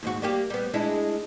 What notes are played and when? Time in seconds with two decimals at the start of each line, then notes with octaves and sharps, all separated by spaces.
0.03 D#2 G#2 F#4
0.22 G3 A#3 G4
0.50 G3 B3
0.74 G#3 D4 E4